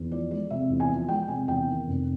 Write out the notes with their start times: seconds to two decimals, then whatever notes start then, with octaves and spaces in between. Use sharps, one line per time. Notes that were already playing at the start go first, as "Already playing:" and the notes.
Already playing: E2
0.11 F3 D5
0.31 G#3 D5
0.50 C3 E5
0.70 E2
0.80 G#5
0.89 F3
1.08 G#3 G5
1.28 C3 G#5
1.48 E2 G5
1.67 D#3
1.87 F1